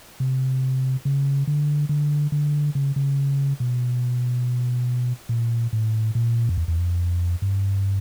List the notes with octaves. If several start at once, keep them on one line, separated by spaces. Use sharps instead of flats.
C3
C#3
D3
D3
D3
C#3
C#3
B2
A#2
A2
A#2
F2
E2
E2
F2
G2